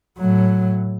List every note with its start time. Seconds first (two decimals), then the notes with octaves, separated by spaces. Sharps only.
0.18 A2 F#3